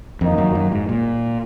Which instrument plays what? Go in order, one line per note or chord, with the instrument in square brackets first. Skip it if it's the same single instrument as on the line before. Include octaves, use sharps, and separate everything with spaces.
[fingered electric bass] F2 [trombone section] D#3 A#3 D#4
[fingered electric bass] F#2
F#2
G#2
A#2